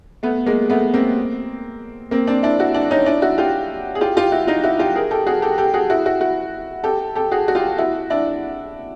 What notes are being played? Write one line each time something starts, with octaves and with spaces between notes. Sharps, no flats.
A3 B3
G#3 A#3
A3 B3
A#3 C4
A#3 C4
C4 D4
D4 E4
E4 F#4
D4 E4
C#4 D#4
D4 E4
E4 F#4
F4 G4
G#4
F4 G4
F4 G4
E4 F#4
D#4 F4
E4 F#4
F4 G4
G#4 A#4
G4 A4
F#4 G#4
G4 A4
G4 A4
F#4 G#4
E4 F#4
E4 F#4
E4 F#4
G4 A4
G4 A4
F#4 G#4
F#4
F4 G4
E4 F#4
D4 E4